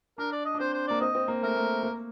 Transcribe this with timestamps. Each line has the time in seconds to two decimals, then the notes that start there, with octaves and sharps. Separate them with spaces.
0.18 D4 A#4
0.32 D5
0.45 D#5
0.55 D4
0.59 C4 C5
0.73 C5
0.87 A#3 D5
1.01 C4 D#5
1.15 C4
1.28 A#3
1.42 A3 A#4
1.56 A3
1.83 A#3